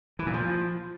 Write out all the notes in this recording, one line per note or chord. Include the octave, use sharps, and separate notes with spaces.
E3
A#2
F3